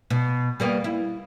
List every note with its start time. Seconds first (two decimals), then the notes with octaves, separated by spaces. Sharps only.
0.10 B2
0.60 G3 A#3 B3
0.84 E4